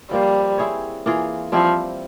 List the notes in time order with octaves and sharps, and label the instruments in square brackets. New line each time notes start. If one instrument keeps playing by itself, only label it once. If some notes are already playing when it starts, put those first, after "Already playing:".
[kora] F3 A#3 F4 C5 [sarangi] G3
[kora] C4 E4 G#4 C#5
E3 A#3 F4 G#4
[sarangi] F3 [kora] G3 C4 E4